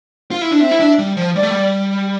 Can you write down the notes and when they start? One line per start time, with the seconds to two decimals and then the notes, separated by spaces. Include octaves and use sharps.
0.31 F4
0.41 E4
0.51 D4
0.61 C4 E5
0.71 E4
0.80 D4
0.99 G3
1.17 F3
1.35 G3 D5
1.43 A3
1.51 G3